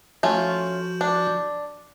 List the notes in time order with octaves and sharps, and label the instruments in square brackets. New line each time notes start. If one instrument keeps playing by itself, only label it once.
[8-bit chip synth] F3 F#4 G6 [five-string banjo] A3 C#4 F4
[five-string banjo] D4